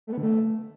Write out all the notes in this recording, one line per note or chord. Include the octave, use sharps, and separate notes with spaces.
A3
B3
D3
A3